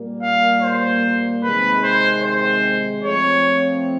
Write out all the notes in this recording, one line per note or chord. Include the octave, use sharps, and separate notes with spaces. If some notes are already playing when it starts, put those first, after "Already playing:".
Already playing: A#2 G3 A#3
F5
C5
C3 D#3 G#3 C4 B4
C5
C5
F3 A3 C4 C#5